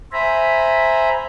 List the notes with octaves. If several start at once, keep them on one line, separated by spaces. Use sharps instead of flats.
C5 E5 G#5 A#5 B5